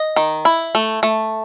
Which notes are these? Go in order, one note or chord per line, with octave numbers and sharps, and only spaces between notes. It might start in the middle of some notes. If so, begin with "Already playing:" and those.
Already playing: D#5
D#3
E4
A3
A3